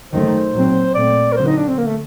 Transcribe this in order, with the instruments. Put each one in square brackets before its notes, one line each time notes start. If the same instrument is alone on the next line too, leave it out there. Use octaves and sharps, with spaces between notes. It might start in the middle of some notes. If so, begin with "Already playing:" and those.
[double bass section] F#2 D#3 A3 [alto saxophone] C5
[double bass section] A#2 F#3 C4
[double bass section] A#2 A3 C4 [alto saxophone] D5
[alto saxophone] A#4
[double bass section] D3 F#3 C4 [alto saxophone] C5
[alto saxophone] D#4
D4
C4
A#3
A3